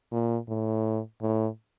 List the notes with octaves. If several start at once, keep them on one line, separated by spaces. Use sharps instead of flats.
A#2
A2
A2